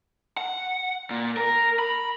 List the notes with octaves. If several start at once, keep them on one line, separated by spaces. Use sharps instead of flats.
F#5
A#2
A#4
B5